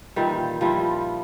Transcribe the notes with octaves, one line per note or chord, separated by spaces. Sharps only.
A#2 D#3 E3 G3
F3 G3 E4 F4